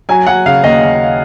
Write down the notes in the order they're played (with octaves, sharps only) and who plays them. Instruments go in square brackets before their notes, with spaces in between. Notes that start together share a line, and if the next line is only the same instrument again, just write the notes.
[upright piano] F#3 G#5
F#3 F#5
C#3 F5
D#2 D#5
C#3